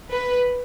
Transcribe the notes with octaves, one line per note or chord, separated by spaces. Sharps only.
B4